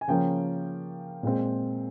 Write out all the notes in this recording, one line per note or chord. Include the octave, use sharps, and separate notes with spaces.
G#5
C#3 F3 A#3 C#4 G5
A#2 G#3 C4